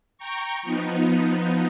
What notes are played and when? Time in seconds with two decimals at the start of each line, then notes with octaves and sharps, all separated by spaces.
0.18 G5 A#5 C#6
0.63 F3 B3 D#4